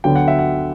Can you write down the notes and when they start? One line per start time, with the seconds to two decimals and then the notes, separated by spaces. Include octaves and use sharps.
0.04 D2 D3 F#3 B3 D4 G5
0.16 F#5
0.28 E5
0.39 F#5